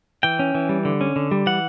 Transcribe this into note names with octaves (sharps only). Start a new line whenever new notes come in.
E3 G5
C#4
E3
G3
D3
C#4
D3
G3
E3 F#5